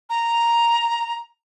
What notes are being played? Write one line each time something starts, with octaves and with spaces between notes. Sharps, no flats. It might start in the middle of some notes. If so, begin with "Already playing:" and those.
A#5